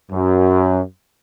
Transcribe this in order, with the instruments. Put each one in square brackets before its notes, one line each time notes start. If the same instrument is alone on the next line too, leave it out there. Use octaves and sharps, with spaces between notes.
[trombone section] F#2